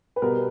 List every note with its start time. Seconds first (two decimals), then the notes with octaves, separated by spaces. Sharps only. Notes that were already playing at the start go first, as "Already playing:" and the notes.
0.16 B4
0.22 B2 G3 B3 A#4